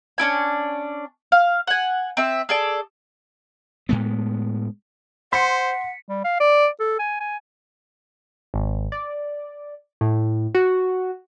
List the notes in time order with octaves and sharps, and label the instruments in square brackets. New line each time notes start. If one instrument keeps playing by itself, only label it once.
[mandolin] C#4 D4 E4 G#5
F5
F#5 G#5
C4 E5
G#4 A4 D5
[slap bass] A2 G#3 B3
[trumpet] C5 [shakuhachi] F#5 [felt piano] C6 [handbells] B6 C#7
[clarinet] G3
F5
D5
A4
G#5
G#5
[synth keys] G#1
D5
A2
F#4